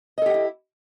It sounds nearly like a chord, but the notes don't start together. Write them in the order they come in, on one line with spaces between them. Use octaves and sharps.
D#5 A4 G4 F#5 E4